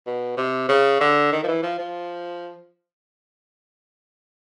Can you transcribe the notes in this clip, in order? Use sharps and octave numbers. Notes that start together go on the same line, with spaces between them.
B2
C3
C#3
D3
D#3
F3
E3
F3
F3